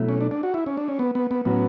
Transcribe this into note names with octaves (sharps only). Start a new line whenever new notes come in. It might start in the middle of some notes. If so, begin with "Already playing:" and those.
Already playing: B2 F#3 A3 E4
C#4
D4
D4
F#4
E4
C#4
D4
C#4
B3
B3
B3
A2 F#3 B3 C#4 F#4